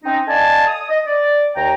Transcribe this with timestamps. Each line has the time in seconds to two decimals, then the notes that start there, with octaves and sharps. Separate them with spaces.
0.04 C4 C#4 D#4
0.28 A4 D5 D#5 F5 G#5 A5
0.67 D#6
0.89 D#5
1.06 D5
1.56 D#2 G5 A#5